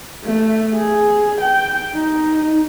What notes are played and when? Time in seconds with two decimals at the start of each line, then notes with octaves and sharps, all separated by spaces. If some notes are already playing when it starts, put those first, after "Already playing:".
0.24 A3
0.75 G#4
1.41 G5
1.94 D#4